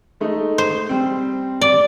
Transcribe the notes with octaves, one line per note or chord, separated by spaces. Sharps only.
G#3 A3 D#4
C5
G3 C4
D5